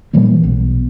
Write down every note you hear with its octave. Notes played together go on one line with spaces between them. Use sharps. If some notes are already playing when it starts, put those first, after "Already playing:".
A#2 E3 G3 A#3
B1 B2